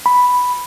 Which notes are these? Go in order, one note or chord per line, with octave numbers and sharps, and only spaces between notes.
B5